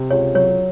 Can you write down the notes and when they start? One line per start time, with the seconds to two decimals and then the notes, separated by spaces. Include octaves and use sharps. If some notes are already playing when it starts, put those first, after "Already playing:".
Already playing: C3
0.11 C#2 C#5
0.35 F#3 C#5